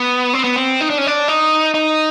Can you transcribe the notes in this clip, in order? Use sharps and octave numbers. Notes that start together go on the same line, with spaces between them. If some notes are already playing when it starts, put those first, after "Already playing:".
Already playing: B3
C4
B3
C4
D#4
D4
C#4
D4
D#4
D#4